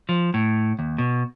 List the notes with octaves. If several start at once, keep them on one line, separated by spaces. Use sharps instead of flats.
F3
A2
D#2
B2